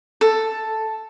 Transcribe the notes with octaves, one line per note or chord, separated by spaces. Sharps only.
A4